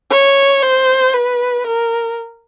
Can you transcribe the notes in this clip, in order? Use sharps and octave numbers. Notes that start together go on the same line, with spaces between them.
C#5
C5
B4
A#4